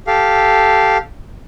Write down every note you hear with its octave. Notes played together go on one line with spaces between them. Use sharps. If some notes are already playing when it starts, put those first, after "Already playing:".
G4 A4 F5